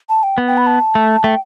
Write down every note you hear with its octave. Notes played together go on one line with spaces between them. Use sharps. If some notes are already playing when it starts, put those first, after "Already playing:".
A5
G5
B3
G5
B5
A5
A3
A3 G5